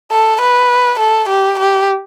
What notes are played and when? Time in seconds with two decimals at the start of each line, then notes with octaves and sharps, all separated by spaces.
0.12 A4
0.42 B4
1.00 A4
1.29 G4
1.59 G4